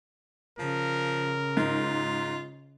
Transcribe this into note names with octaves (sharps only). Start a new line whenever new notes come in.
C#3 F3 A#4
G#2 F4